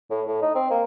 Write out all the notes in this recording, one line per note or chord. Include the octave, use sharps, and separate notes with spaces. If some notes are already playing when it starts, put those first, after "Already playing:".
A2
A2
D#4
C4
A#3